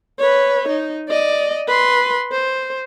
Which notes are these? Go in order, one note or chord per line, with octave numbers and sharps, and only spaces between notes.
B4 C#5
D#4
D5 D#5
B4 C6
C5